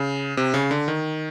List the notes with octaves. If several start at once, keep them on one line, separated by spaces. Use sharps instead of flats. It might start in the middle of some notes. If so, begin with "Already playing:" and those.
Already playing: C#3
C3
C#3
D3
D#3